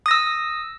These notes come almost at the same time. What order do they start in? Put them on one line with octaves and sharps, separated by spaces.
D#6 A#6 E6